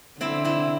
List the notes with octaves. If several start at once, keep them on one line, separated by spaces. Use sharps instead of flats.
D3 C4 E4
C4 E4